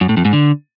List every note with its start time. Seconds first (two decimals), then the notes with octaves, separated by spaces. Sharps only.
0.01 F#2
0.09 A2
0.17 F2
0.25 G#2
0.33 D3